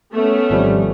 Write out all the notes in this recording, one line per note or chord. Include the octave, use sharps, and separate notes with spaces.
A3 B3 C#4
G#1 F3 G3